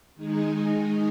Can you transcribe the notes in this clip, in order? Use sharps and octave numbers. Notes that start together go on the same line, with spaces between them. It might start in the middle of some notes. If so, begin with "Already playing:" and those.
D#3 G#3 D#4 G#4